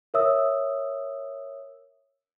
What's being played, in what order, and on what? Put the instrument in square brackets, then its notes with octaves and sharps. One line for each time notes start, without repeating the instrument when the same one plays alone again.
[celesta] A#4 C#5 E5 D#6 E6